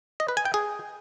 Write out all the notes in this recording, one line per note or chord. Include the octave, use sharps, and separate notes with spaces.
D#5
B4
G#5
G5
G#4